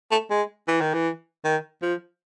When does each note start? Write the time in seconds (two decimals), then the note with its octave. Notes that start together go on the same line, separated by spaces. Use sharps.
0.11 A3
0.30 G#3
0.68 E3
0.81 D#3
0.94 E3
1.44 D#3
1.82 F3